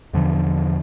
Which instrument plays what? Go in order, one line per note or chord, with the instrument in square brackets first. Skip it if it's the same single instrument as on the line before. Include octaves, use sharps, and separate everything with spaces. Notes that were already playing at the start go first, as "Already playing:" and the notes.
[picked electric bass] E2 B2 D3 F3